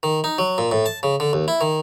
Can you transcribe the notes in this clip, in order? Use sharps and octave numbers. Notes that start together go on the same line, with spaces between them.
D#3
D#4
F#3
A#2
A2
A5
C#3
D3
D#2
E4
D#3